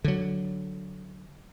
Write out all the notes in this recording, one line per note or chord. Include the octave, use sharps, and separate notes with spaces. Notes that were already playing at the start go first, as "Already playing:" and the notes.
D3 F#3